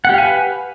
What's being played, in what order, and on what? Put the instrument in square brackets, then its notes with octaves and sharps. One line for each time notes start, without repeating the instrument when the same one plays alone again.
[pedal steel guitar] F#5
G4
F5
G#5
B4